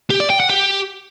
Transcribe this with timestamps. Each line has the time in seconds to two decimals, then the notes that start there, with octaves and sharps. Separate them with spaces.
0.10 G4
0.20 D5
0.30 G5
0.40 F#5
0.50 G4